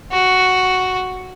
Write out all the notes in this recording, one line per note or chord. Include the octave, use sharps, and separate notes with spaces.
F#4